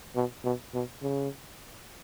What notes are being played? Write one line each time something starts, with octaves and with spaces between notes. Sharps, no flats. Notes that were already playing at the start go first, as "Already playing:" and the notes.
B2
B2
B2
C#3